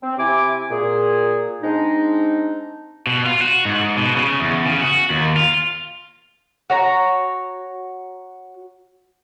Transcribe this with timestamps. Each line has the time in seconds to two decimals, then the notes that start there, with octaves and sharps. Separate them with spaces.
0.02 C4
0.17 C3 E4 G#5 D6
0.70 A#2 G#4
1.62 G#3 C4 D4 D#4
3.07 B2
3.26 F4
3.41 F#4
3.65 G#2
3.97 B2
4.16 C#3
4.40 E2
4.66 C#3
4.81 F#4
5.10 D#2
5.37 F4
6.70 F#4 C#5 A#5